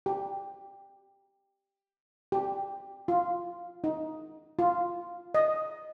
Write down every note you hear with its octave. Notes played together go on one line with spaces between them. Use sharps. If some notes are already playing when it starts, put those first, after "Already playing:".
G4
G4
F4
D#4
F4
D#5